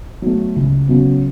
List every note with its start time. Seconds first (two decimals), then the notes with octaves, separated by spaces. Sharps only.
0.22 F#3 A3
0.56 C#2
0.88 C#3 F#3 B3